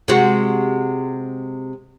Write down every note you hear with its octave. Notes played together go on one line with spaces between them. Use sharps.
C3 G#3 F#4